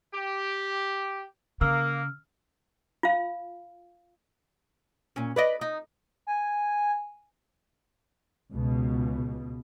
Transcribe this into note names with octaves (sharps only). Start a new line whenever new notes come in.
G4
C#3 A#3 E6 F6
F4 F5
A#2 C#4
B4 D5 D#5
D#4
G#5
C#2 B2